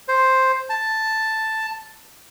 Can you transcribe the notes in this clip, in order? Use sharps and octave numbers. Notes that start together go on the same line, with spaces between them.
C5
A5